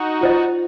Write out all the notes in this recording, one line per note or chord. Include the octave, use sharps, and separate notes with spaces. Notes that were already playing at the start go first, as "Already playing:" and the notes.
Already playing: D#4 F#4
F4 C5 D#5